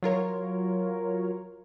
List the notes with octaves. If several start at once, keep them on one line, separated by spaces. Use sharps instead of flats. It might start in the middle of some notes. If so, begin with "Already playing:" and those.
F#3 F4 A#4 C#5